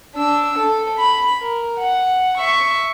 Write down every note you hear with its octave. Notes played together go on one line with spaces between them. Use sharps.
D4 E6
A4
B5
A#4
F#5
E5 C#6